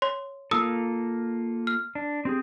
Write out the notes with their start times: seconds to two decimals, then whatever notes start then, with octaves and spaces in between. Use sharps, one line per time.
0.02 C#5 C6
0.51 A#3 F4 A4 D#6 E6
1.67 F6
1.95 D4
2.25 C4 G4 G#4